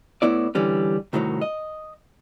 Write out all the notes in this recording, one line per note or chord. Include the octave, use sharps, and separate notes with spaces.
A2 B3 E4 D5
D3 E3 G3 C#4
C2 A2 D#3 F3 F#3
D#5